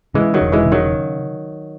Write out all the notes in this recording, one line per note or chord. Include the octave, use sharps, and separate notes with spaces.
C#3 E3 G#3
D#3 F#3
E1
E3 G#3
C#3
D#3 F#3